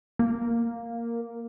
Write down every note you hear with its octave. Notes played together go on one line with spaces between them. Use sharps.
A#3